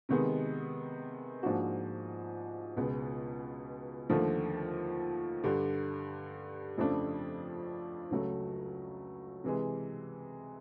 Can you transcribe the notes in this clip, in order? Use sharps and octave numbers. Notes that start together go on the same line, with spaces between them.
C3 D#3 G#3 B3
G#2 F3 A#3 D4 F#4
C#2 B2 G#3 B3
D#2 D3 F3 A3
G2 D3 G3
F2 C#3 F3 A3 D4
C#2 C#3 F#3 A3
C3 E3 G#3